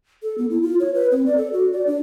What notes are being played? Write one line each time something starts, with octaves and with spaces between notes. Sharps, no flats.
A4
B3
E4
F4
C#5
B4
C4
D5
A4
F#4
D5
D4